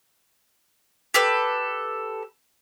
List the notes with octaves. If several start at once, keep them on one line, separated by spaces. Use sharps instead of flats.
G4 A4 B4